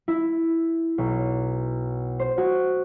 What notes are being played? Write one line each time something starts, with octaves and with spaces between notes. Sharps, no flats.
E4
B1
C5
F#4